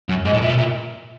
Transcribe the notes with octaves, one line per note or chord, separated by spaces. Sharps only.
F#2
G#2 D#5
A2
A#2 E5
B2
A#2 E5